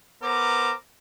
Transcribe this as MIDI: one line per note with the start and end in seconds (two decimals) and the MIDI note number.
0.23 0.72 59
0.23 0.72 70
0.23 0.72 72
0.23 0.72 82
0.23 0.72 86